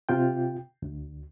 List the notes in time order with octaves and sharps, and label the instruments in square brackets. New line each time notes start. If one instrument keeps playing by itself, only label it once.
[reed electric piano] C3 F4 G5
D2